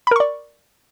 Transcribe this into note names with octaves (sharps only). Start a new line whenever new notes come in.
A#4 D5 B5 C#6